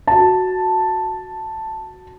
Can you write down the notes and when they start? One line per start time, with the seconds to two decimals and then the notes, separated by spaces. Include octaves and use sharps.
0.07 F#4 A5